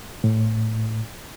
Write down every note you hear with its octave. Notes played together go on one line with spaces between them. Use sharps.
A2